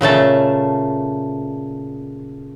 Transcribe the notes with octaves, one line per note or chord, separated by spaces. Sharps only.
A#2 C#3 A3 A5